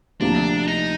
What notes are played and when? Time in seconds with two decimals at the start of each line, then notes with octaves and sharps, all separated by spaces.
0.21 D2 C3 F3 A#3 D4
0.68 D#4